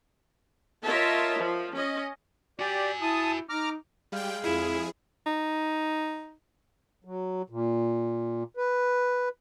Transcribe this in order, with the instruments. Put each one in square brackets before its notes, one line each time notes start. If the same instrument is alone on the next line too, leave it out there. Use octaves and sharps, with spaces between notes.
[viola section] F4 A#4 C#5 D#5 E5 A5
F3
C#4 D#5
[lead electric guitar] F#4 G#5 [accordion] G4 D5
[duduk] E4 [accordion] A5 D#6
[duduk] D#4 [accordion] A#5 D6 F6
[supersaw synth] G3 G5 [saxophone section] G#3 F5
[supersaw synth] F2 G#4 [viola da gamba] E4
[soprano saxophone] D#4
[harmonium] F#3
A#2
B4